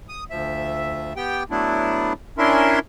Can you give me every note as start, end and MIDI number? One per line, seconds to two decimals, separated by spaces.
0.09 0.24 87
0.30 1.13 38
0.30 1.13 53
0.30 1.13 76
1.16 1.43 59
1.16 1.43 67
1.16 1.43 79
1.51 2.13 54
1.51 2.13 57
1.51 2.13 59
1.51 2.13 62
1.51 2.13 64
2.38 2.79 61
2.38 2.79 62
2.38 2.79 64
2.38 2.79 70
2.38 2.79 76
2.38 2.79 84